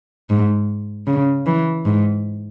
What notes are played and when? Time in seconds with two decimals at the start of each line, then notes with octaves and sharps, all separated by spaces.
0.30 G#2
1.07 C#3
1.46 E3
1.85 G#2